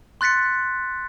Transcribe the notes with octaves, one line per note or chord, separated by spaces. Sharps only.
C6 F#6 A6 B6 C#7